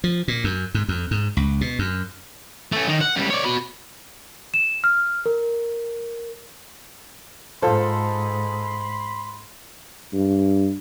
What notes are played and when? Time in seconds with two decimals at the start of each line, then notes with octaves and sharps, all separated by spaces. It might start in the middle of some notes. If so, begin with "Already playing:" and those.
0.04 F3
0.28 A#2
0.44 F#2
0.74 G#2
0.88 F2
1.11 G#2
1.37 C#2
1.61 B2
1.79 F#2
2.72 A3 C#4
2.88 D#3 D#4
3.01 F#5
3.17 C#2 G3
3.31 C#5 D5
3.45 F#4 B5
4.54 E7
4.84 F6
5.26 A#4
7.62 G#2 F4 A4 C5 B5 C6
10.13 G2